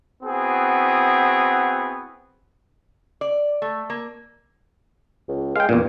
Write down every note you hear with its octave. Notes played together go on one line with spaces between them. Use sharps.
B3 C4 E4 F#4 G#4
D5
A3
A#3
C#2
G#3 F5 G5
E2 G2 A#2